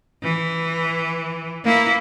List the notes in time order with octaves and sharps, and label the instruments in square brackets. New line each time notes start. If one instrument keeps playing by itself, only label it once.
[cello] E3
A#3 E4